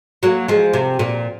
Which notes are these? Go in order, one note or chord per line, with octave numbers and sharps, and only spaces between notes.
F#3 A#3
F3 G#3
C3
A#2